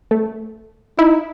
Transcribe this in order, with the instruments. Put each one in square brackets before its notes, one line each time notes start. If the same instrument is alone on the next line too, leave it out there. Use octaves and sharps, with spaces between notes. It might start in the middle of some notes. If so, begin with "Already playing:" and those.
[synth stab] A3
[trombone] D#4 [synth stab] E4